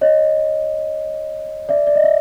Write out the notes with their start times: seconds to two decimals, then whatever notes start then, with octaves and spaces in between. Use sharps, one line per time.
0.01 C#5 D#5
1.69 D5 E5
1.87 D5
1.95 D#5
2.03 E5